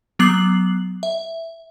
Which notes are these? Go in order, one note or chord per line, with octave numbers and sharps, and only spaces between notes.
F#3 B3 D6 F#6 C7 F#7
E5